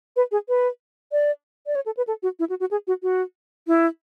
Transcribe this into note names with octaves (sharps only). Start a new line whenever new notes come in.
B4
G#4
B4
D5
D5
C#5
A4
B4
A4
F#4
E4
F#4
F#4
G#4
F#4
F#4
E4